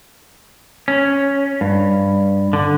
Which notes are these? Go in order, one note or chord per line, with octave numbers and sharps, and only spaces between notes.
C#4
G2
D3